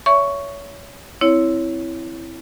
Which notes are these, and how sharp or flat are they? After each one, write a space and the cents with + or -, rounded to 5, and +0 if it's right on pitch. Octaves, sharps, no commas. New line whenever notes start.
C#5 +25 E5 +10 C#6 +5
C4 +0 E4 +0 C#5 +10